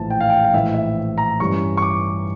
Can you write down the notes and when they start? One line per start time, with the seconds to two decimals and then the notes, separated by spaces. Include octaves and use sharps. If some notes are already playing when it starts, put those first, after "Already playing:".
Already playing: A#1 A2 E3 A5
0.10 G5
0.21 F5
0.30 G5
0.45 F5
0.54 A#1 A2 E3 E5
0.74 E5
1.18 A#5
1.39 G2 E3 G3 C#4 C#6
1.77 C#6
1.82 D6